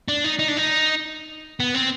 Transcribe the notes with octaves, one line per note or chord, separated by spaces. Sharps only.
D4
D#4
D#4
D4
D#4
B3
C4